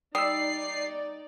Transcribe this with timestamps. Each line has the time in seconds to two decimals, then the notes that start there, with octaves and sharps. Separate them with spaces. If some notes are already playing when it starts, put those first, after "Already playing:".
0.15 G3 D#4 D5 D#6 E6 C7